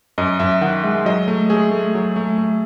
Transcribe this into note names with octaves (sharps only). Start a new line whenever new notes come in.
F#2 D#5
F#2 E5
D#3 F#5
G#3 E5
F#3 D#5
A3
A3 G#4
A3
F#3
A3
A3